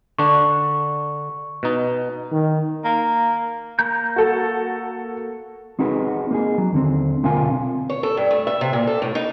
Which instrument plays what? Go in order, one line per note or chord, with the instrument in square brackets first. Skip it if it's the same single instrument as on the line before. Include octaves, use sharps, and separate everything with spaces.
[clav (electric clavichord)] D3 D4 [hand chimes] C#6
[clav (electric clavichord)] B2 D#4
[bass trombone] D#3
[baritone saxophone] A#3
[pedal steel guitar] A#3 A#5 G6
[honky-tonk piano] F#4 A4
[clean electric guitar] C4 D#4 F#4 G#4 B4
A#3 D#4 G#4
F#3
D#2 D3 C4
B1 D3 C4 F4 A#4 G#5
[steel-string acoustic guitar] C#5
A4
G2
A3
E5
C3
A#2
A4
A2
D#4